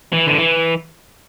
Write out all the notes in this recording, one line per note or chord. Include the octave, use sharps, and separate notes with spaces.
E3
D3
E3